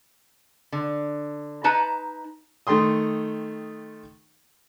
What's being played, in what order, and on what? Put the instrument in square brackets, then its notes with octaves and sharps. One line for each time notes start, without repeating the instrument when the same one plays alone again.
[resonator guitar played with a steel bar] D3
D#4 B4 A5 A#5
[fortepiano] D#3 A3 G5 C6 D#6